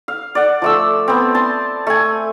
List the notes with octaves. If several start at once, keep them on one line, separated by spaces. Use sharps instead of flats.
F5
D5 F#5
F3 A3 E6
B3 C4
A5 C6
A3 G#5